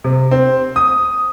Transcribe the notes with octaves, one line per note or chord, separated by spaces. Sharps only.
C3
C4
D#6